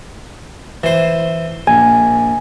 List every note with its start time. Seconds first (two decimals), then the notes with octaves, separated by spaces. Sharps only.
0.84 E3 C5
1.67 A#1 G#5